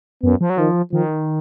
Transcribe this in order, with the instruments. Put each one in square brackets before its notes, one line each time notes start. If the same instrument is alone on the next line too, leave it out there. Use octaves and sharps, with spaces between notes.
[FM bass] F#2 [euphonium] B3
[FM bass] F3
F#3
[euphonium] D#3 [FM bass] F3
[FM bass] D#3 [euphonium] F3